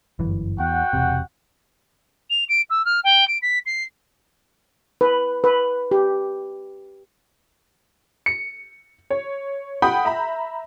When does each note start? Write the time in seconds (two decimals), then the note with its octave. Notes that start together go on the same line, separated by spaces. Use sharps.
0.19 G1 F#2 E3
0.60 E2 F#4 F#5 G5
0.93 E1 C3
2.30 F7
2.49 D7
2.70 E6
2.85 F6
3.04 G5
3.27 D7
3.42 B6
3.66 C7
5.01 B4
5.44 B4
5.91 G4
8.26 C#7
9.10 C#5
9.82 F#5 G5 B5 D#6 G6
10.05 E5 A#5 B5